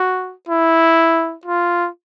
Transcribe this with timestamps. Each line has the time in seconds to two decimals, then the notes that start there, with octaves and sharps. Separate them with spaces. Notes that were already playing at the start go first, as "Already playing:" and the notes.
Already playing: F#4
0.49 E4
1.45 F4